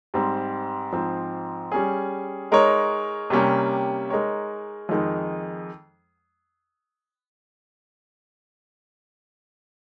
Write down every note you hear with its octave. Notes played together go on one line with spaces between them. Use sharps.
G#2 G3 C4
G#2 F3 C4
G3 C#4 G#4
G#3 D#4 A#4 C#5
C3 G3 A#3 C#4 G4
G#3 D#4 A#4 C#5
F2 D#3 G#3 D#4